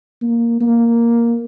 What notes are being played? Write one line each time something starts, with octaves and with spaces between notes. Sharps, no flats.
A#3
A#3